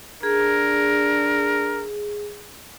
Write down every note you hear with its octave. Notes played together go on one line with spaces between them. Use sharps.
D4 G#4 A#4